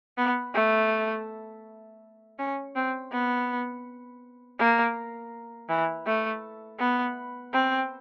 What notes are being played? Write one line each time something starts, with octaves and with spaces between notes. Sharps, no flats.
B3
A3
C#4
C4
B3
A#3
E3
A3
B3
C4